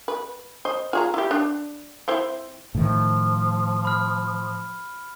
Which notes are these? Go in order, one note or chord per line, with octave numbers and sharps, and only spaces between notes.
B4
C5 D#5
F4 G#4 A#5
E4 G4
D4
C4 E4 C5
A2 D#3 F3
B5 F6